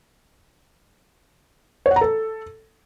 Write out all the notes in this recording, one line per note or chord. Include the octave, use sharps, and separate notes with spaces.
C#5
F#5
A#5
A4